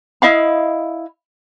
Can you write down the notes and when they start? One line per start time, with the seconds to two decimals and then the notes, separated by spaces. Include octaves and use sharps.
0.22 E4 D#5 F5 B5